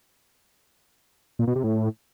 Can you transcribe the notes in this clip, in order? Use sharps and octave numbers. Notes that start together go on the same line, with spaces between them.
A#2
B2
C3
A2